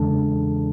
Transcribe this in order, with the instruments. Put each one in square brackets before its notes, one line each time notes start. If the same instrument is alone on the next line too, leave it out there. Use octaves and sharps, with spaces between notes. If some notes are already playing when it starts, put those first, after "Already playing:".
Already playing: [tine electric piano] E2 C#3 E3 G#3 D4 A4 A5